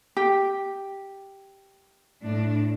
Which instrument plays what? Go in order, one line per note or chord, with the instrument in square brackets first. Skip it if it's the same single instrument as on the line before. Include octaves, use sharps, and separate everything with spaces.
[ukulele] G4
[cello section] A2 D4